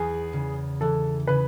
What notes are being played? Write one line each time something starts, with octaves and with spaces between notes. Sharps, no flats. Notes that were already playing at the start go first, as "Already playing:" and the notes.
Already playing: E2 G#4
C#3
E3 A4
C#3 B4